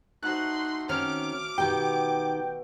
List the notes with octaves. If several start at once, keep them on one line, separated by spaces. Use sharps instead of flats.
A3 D#4 F#4 C5 C6 F#6
D#3 C4 C#4 D6 F6
B2 D#3 G4 G5